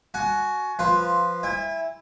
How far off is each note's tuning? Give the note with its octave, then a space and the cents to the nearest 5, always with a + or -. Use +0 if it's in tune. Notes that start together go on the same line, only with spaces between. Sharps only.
F#4 +0 G#5 +30
F3 +0 F4 +5 B4 +0
E4 +0 G#5 -40